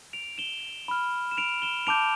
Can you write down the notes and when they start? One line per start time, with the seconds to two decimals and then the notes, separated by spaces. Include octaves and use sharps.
0.13 D7 F7
0.38 E7 G7
0.88 B5 F6
1.31 E7
1.37 D7 F7
1.62 E7 G7
1.87 A5 D6 G6 D7 F7